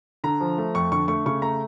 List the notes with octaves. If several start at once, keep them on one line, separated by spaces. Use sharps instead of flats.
D3 A#5
F3
A3
F2 C#6
D3 C#6
A3 C#6
C#3 C#6
A3 A#5